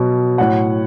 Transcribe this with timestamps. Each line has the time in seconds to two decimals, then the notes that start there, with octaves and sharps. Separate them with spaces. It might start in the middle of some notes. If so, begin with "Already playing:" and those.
Already playing: B2 F#3
0.38 A2 F#3 F#5